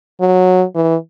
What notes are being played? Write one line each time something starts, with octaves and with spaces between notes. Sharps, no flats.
F#3
E3